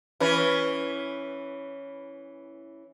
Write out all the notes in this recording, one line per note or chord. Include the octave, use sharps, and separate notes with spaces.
E3 C#4 B4